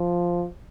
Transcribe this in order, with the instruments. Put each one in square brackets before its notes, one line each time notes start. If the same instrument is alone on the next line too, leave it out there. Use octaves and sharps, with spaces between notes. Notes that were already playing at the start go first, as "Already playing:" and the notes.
Already playing: [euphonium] F3